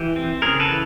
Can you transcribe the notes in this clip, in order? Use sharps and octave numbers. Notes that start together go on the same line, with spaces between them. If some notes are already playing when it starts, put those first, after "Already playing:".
Already playing: E3 G4
C4
C#3 G#4 A#4
A4 B4
E3